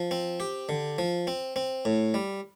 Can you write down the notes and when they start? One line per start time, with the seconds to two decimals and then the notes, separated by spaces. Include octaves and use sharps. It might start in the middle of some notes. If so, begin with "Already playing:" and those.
Already playing: F3
0.11 C4
0.40 G4
0.69 D3
0.98 F3
1.27 C4
1.56 C4
1.85 A2
2.14 G3